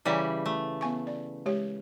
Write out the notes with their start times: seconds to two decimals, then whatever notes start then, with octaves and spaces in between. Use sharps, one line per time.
0.05 C#3 E3 G3 D5 A#5
0.46 A3
0.81 B3 G#5 C#6
1.07 D5
1.46 G#3 G4 C#5